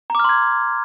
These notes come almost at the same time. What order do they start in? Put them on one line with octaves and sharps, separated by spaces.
A#5 D6 F6 C6 G#6